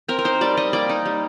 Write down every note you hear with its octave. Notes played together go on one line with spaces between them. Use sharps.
C4 A#4
A#4
D#4 C5
G3 D5
G3 D#5
A#3 D5
D#4
G3